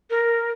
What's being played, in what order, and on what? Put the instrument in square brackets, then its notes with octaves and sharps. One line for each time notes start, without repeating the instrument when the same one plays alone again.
[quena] A#4